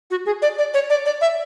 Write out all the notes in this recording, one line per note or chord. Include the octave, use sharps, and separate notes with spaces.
F#4
G#4
D5
D5
C#5
D5
D5
E5